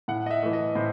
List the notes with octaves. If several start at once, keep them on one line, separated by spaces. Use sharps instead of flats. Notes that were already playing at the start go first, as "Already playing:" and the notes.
A2 F#5
D#5
E5
E3 A3
D#5
A2 C5